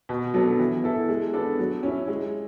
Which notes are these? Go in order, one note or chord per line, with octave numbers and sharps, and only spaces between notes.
B2
F#3 B3 D4 A4
E3
B3 E4 A4
G#3
B3 D4 A4
F#3
C#4 E4
G#3